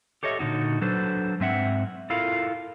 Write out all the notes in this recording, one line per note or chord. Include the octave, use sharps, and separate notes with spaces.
G4 A4 C#5 D#5 E5
A#2 D3 D#4 F#4
F#3 D4 A4 B4 C5
G#2 C4 E5 F#5
E4 F4 A4 A#4 F5